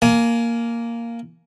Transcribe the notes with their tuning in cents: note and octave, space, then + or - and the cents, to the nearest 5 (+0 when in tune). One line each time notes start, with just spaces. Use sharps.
A#3 +0 G#5 +20